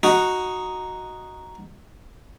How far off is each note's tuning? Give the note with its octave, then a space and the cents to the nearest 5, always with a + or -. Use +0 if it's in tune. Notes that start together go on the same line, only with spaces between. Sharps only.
D#4 +0 F#4 +0